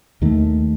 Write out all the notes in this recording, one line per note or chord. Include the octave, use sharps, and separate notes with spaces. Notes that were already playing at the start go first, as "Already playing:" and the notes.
D#2 D#3 A3